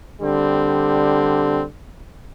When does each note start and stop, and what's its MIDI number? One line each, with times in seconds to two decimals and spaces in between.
0.21 1.64 50
0.21 1.64 55
0.21 1.64 60